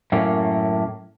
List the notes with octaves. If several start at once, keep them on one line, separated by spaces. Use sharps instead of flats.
F#2 A2 A3 A#3 C#4